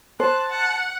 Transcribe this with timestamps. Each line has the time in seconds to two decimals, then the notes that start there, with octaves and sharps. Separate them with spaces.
0.20 C5 A5 F#6
0.49 F#5